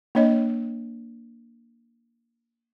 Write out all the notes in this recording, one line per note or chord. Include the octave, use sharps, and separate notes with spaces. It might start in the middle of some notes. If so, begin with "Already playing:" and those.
A#3 D4 C#5 D#5